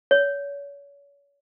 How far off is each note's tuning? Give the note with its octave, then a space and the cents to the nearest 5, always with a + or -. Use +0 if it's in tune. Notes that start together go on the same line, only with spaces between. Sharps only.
C#5 +35